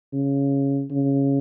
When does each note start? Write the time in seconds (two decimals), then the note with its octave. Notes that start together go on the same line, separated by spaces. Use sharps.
0.13 C#3
0.91 C#3